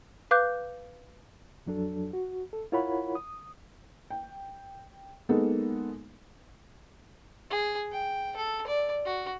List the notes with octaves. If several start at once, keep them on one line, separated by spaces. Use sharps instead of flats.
B4 F5 D6 F#6 G6
F2 F#3 D4 A4
F#4
A4
E4 F4 A#4 C#5 F#5 B5
D#6
G5
G#3 A#3 B3 D#4 A4
G#4
G5
A4
D5
F#4